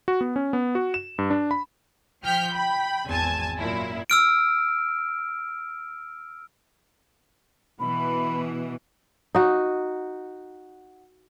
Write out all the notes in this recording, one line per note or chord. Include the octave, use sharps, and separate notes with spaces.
F#4
B3
C#4
B3
F#4
E7
G2
D4
B5
F3 G5 F6 G6 B6
G5 B5
G#1 E2 C4 G#5 A5
F#2 A#2 E4
E6 F6 D7
B2 E3 B5
D#4 F#4